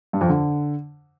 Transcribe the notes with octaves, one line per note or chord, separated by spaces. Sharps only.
G2
F2
D3